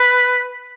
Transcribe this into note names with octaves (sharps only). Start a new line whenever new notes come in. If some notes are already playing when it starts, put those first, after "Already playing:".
Already playing: B4